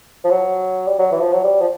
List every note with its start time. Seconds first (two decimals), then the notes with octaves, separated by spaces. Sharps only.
0.24 F3
0.31 F#3
0.88 G3
0.99 F#3
1.12 E3
1.21 F3
1.33 F#3
1.44 G3
1.61 F3